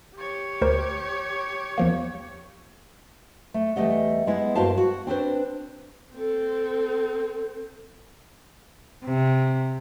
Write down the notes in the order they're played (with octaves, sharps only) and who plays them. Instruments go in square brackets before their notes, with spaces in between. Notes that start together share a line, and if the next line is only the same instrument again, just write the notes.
[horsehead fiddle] G4 C#5
[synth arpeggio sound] D2 A#4 C5
E2 F3 A#3
[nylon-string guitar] A3
E2 G3 A3 D#5 F#5
G#3 B3 E4
G2 A#3 F#4 C5 F5 A5
F#4
C4 D4 B4 C5
[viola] C4 A4
[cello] C3